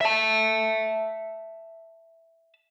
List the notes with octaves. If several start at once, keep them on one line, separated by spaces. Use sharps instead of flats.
E5 A5